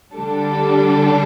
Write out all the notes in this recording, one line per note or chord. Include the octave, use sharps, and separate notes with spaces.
D3 G3 D4 A4